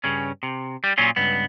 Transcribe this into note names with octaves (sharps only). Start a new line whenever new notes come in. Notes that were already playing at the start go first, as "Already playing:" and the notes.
G2 C#3 C#4
C3
G3
A#2 F#3 C#4 F4
C#2 G2 B3